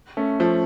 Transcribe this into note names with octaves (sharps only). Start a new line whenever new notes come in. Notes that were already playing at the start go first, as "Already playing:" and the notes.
A3 C#4
F3 A3